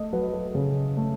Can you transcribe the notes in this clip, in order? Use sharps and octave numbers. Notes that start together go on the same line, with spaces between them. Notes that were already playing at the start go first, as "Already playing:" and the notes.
Already playing: A3 D#5
F#3 B4
A4
C#3
A3